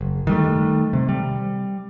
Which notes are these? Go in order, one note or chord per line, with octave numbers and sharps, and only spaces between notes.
F#1
D#3 G3 A3
C3
G3